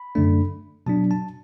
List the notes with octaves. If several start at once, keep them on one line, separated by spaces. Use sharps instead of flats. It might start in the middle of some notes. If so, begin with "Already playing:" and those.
Already playing: B5
F#2 D3 A3 D4
B2 F#3 D4 A5
A5